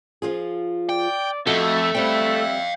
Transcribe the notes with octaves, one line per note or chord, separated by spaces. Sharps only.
F3 F4 G#4
D5 G5
F2 F3 A3 F#4 D#5 E5
G3 C4 F5 G5